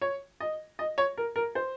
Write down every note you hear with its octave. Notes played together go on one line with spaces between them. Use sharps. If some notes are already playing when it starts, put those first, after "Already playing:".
C#5
D#5
D#5
C#5
A#4
A#4
C5